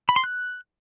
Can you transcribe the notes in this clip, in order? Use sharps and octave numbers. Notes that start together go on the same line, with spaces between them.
B5
C6
F#6